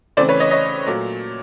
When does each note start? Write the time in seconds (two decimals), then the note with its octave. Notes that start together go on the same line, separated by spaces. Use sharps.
0.17 C#3 E3 A3 C4 C5 D5
0.29 B4 C#5
0.40 C#5 D#5
0.51 C#5 D#5
0.86 A#2 F#3 A3